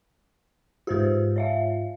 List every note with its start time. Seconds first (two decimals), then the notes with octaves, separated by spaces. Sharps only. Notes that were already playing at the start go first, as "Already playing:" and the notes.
0.87 G#2 F4 G4 G#4 C5
1.36 C#5 E5 F5